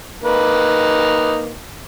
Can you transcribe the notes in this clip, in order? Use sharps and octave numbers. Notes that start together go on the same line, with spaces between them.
A#3 D#4 B4